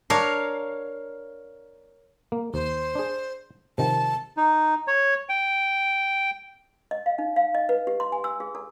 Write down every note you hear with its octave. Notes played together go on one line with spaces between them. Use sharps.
D4 A#4 C#5 F5
A#3
D#2 C5
D4 G#4
C3 D#3 F3 A5
D#4
C#5
G5
D#5
F5
D#4
F5
D#5
B4
G4
C6
G#5
E6
G#4
A4